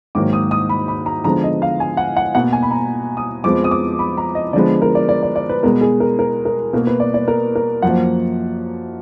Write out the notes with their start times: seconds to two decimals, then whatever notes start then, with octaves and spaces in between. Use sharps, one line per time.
0.15 G#2 D#3 F#3 A#3 D6
0.33 D#6
0.51 D#6
0.69 B5
0.88 B5
1.06 A#5
1.24 D3 F3 G#3 B3 A#5
1.44 D#5
1.62 F5
1.80 G#5
1.97 F#5
2.16 F#5
2.35 B2 A#3 F#5
2.52 G#5
2.63 B5
2.71 A#5
3.17 D#6
3.44 F2 F3 G#3 B3 D6
3.64 D#6
3.71 D6
3.99 B5
4.17 A#5
4.35 D#5
4.53 D3 F3 G#3 B3 D5
4.82 A#4
4.95 D5
5.09 D5
5.22 D5
5.36 D5
5.49 B4
5.63 B2 G#3 B3 A#4
5.81 G#4
6.00 A#4
6.19 A#4
6.45 A#4
6.73 B2 A#3 A#4
6.87 B4
7.00 D5
7.14 D5
7.28 A#4
7.55 A#4
7.82 F#2 F3 A#3 F#5